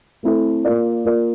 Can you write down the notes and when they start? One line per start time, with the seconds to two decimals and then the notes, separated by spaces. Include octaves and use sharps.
0.23 A3 C4 E4 A4
0.65 A#3 F4 A#4 D5
1.05 A#3 F4 A#4 D5